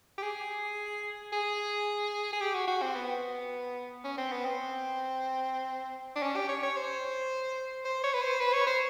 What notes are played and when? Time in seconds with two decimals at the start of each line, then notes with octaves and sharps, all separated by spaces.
0.18 G4
0.23 G#4
1.32 G#4
2.33 G#4
2.41 G4
2.54 F#4
2.68 F#4
2.82 C4
2.95 B3
4.04 C#4
4.18 C4
4.32 B3
4.45 C4
6.15 D4
6.22 C#4
6.36 G4
6.49 C#5
6.63 C#5
6.77 C5
7.85 C5
8.04 C#5
8.14 B4
8.22 C5
8.40 B4
8.53 C#5
8.67 C5